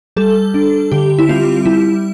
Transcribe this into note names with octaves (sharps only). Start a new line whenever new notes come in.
G3 A4
D4
D3 G4
E4
G3 C4 F4
G3 E4